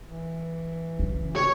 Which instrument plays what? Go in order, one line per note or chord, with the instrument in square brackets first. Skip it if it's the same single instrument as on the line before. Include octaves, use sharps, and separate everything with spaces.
[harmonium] E3
[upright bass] C#3
[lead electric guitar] C#5